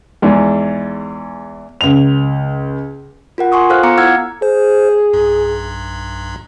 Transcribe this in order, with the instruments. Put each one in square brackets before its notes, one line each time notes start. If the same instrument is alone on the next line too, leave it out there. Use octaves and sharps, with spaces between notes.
[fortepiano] E2 G#2
[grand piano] C#2 F7
[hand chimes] F4 A#4 F#5
G#5 C6 C#6 D#6
F4 A4 C5 F5 F6 F#6
B3 F5 A#5 D6 C#7
E4 F5 F#5 E6 F6 G#6
[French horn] G#4 [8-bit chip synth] C5
[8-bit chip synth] B1 G2